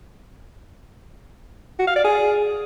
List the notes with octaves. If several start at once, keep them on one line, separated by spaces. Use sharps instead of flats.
F#4
F5
D5
G#4